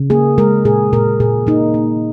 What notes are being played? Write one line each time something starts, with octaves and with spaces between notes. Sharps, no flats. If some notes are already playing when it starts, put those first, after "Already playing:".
Already playing: C#3
A#3 G#4
G#3 A#4
A#2 G#4
A#2 A#4
A#2 G#4
A#3 D#4
A#3